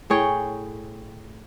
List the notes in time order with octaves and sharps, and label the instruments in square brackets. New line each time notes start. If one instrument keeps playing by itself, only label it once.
[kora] A2 G#4 C#5 G5